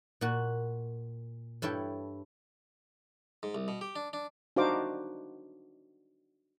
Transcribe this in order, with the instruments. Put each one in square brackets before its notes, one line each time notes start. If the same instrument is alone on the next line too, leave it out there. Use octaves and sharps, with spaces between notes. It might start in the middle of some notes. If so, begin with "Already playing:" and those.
[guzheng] A#2 F#4
G2 E4 A4 C#5 G5
[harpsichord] G#2
C2
B2
G4
D4
D4
[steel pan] D4 D#4 F#4 C5 F5 D6